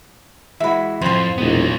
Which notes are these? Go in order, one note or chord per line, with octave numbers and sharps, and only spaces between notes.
E3 G#3 F#4 E5 B5
F2 A2 C5 C6
E1 A#2 B3 D#4